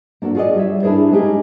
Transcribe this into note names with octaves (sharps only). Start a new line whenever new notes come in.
A#3 D4 F#4 A4
F4 F#4 G#4 C5 D5 D#5
G3 C#5 E5
D4 E4 G#4 A#4 C5
G#3 C#4 D#4 G4 G#4